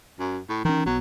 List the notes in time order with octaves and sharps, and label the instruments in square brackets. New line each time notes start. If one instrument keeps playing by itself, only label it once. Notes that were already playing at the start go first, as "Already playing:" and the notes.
[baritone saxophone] F#2
A2
[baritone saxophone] D#3 [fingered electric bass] E3 C#4
[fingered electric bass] B1 B3 [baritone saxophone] F#3